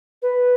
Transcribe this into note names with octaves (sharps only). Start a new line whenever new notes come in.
B4